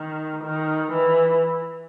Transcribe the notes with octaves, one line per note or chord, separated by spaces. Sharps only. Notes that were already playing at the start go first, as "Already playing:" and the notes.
Already playing: D#3
D#3
E3